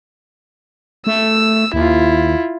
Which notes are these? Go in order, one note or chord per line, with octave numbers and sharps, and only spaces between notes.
A3 E6
D#2 E4 F4